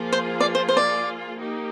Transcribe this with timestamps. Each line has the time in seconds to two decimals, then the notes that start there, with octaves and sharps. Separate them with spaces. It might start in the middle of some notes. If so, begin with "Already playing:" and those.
Already playing: F3 A#3 F4 G#4
0.13 C5
0.40 D5
0.55 C5
0.69 C5
0.77 D5
1.39 A#3 D#4 G4